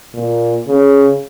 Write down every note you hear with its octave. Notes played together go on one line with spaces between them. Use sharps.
A#2
C#3